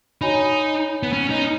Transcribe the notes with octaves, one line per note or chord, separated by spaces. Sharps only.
D#4 F#4 C#5 G#5 B5
B3
C#4
D#4